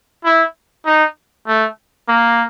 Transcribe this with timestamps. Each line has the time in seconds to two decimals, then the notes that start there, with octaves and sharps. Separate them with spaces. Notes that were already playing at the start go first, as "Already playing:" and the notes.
0.25 E4
0.86 D#4
1.47 A3
2.08 A#3